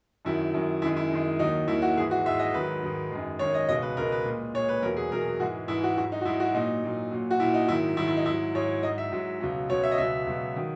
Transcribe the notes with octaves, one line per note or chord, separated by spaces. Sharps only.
F#2 D#3 F#3 E4
F#2 D#3 F#3
F#2 D#3 G#3 E4
E4
F#2 D#3 G#3
D#2 D#3 F#3 D#4
D#2 D#3 F#3 E4
F#4
G#2 E3 G#3 G#4
F#4
G#2 E3 G#3 E5
D#5
G#2 D#3 F#3 B4
G#2 D#3 F#3
F#2 D#3 G#3
F#2 D#3 G#3 C#5
D#5
C#2 B2 G#3 D#5
B4
C#2 B2 G#3 A#4
B4
A#2 G#3
A#2 G#3 C#5
B4
E2 B2 F#3 A#4
G#4
E2 B2 F#3 A#4
G#2 E3 G#3 F#4
G#2 E3 G#3 E4
F#4
G#2 F#3 F#4
D#4
F#4
G#2 F#3 E4
F#4
A#2 F#3 D#4
A#2 F#3
A#2 F#3
F#4
A#2 F#3 E4
D#4
G#2 D#3 F#3 E4
G#2 D#3 F#3 E4
E4
D#4
G#2 F#3 E4
G#2 F#3 C#5
G#2 F#3 D#5
E5
G#2 F#3
C#2 B2 F#3
C#2 B2 F#3 C#5
E5
D#5
C#2 B2 F#3 E5
C#2 B2 F#3
D#3 F#3